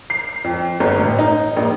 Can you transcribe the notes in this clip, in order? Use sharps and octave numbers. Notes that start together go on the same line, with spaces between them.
C7
C7
F2
G1
A1
D#4
A#1